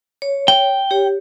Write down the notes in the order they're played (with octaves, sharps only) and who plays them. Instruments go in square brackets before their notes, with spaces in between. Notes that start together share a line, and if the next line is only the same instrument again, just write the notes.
[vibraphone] C#5
[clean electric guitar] G5
[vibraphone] G4 C#5